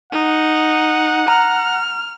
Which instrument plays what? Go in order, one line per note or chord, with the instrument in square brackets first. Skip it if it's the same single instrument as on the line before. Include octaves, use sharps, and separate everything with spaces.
[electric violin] D#4 [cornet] F#5
[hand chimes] A#5 [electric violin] F6